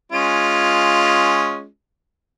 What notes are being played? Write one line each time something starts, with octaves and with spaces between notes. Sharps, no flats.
G#3 C#4 F4